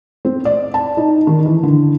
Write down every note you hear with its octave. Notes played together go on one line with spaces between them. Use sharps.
C4
D5
A5
D#4
D#3
E3
D3